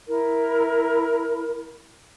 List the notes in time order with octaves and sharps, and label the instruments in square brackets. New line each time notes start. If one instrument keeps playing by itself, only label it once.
[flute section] E4 A#4